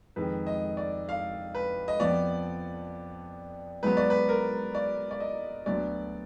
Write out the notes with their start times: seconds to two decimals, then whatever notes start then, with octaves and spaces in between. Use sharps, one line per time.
0.16 F2 D#3 G#3 B4
0.46 D#5
0.77 D5
1.09 F5
1.55 B4
1.88 D#5
2.00 F2 F3 B3 D5
3.83 G#2 F#3 B3 B4
3.97 D5
4.10 B4
4.29 A#4
4.75 D5
5.11 D5
5.20 D#5
5.66 D2 D3 F#3 B3 D5